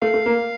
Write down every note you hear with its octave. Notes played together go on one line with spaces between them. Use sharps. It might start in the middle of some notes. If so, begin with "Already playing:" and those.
A3 F5
A3
A#3